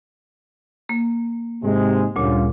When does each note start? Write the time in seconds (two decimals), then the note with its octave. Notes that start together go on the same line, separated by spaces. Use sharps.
0.89 A#3
1.63 G#2 C3 G#3
2.16 D2 G2 A#2 C#3 F4